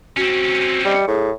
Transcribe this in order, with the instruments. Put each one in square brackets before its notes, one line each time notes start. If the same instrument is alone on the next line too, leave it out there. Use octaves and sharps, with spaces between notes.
[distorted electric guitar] C4 C#4 [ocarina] F#4
[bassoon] G3 [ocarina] D#5
[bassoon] A2 [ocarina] G#4